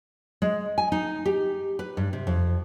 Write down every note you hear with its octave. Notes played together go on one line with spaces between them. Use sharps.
G#3
G#5
D#4
G4
B4
G2
C3
F2